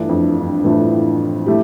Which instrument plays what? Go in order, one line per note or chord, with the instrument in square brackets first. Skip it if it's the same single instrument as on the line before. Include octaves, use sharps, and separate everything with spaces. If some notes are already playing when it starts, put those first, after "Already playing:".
Already playing: [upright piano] G2 [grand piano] E3 A3 D4 F4
[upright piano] F2
G2
[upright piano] A2 [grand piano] E3 A3 D4 F4
[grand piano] A3 E4 G4